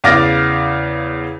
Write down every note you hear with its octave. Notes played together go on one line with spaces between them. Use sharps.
E2 C#3 F5 D6 A6 A#6